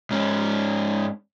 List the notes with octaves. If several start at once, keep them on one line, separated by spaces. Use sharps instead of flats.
G#2 C#4